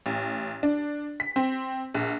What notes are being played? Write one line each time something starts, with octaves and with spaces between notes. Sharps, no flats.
A1
D4
B6
C4
A#1